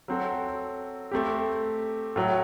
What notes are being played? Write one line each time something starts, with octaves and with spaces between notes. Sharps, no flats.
F#3 C4 F#4 A4
A3 C4 G4
A2 F#3 A3